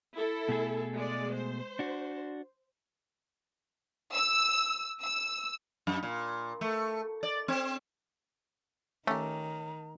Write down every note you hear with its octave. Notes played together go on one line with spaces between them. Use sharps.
E4 A4
B2 A3 G#4
G#3 D5
C5
D4 F#4
E6
E6
F#2
A#2
A3
D5
C4
D#3 A3 C#4 G4 A#5